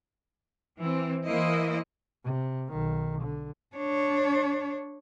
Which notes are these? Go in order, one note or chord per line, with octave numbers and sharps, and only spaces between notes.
E3 C4
E3 A#3 E4 C5 D#5
C3
B1 D#3
D3
D4 C#5